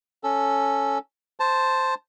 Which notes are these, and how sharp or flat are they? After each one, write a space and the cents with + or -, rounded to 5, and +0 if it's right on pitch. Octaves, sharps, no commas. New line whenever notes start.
C#4 +0 A4 +0
C5 +0 A5 +0